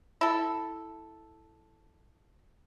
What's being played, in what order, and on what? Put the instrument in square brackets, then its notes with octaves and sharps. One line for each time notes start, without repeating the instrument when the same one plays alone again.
[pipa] E4 A4